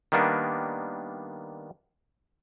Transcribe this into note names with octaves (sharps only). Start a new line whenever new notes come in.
D#3 G3 A#3 B3 D4